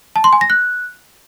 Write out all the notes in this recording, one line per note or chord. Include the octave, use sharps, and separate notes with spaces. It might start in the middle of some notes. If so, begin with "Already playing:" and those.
A5
C6
G#5
A#6
F#6